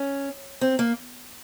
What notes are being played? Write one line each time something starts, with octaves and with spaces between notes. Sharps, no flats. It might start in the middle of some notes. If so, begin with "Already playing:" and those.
Already playing: C#4
C4
A#3